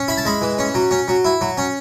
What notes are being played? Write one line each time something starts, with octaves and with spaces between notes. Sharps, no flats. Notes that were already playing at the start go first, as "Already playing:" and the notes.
Already playing: C#4
E4 B5
A5
G#3 B5
E3
C#4
F#3
C#4
F#3
E4
F#3
C#4